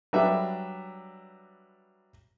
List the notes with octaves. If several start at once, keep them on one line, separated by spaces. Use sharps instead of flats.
F#3 G3 D4 B4 E5